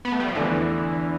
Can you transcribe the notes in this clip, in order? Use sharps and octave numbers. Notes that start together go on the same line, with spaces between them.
B3
A3
G3
F3
E2 D3 E3 A3 D4